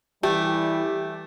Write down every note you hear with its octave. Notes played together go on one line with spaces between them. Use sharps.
E3 G3 A3 G4